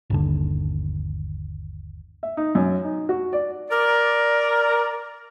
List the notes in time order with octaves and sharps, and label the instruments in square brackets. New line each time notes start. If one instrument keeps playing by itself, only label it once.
[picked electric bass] G1 D#2 D3
[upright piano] E5
D#4
F#2
D#4
F#4
D5
[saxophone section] A#4 D5